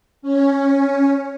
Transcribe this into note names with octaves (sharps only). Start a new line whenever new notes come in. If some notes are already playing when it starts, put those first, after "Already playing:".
C#4